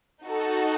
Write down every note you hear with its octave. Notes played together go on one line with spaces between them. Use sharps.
D#4 F#4 A4